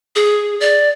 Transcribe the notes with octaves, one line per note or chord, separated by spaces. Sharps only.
G#4
D5